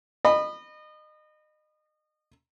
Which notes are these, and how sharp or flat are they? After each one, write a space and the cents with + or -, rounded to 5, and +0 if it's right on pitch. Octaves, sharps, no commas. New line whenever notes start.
D#5 -30 B5 +0